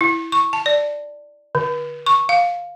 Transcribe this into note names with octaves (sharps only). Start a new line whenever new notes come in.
E4
C#6
A5
D5
D3
C#6
F5